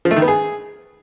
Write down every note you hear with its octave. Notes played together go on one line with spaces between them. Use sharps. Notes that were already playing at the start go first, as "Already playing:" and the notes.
F3
A3
D#3
B3
G#4